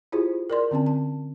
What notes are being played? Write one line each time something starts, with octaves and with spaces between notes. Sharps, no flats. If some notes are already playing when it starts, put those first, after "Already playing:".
E4 F4 G4 G#4 C5
A#4 D5 C6
D3 C4 C#4 A5
A5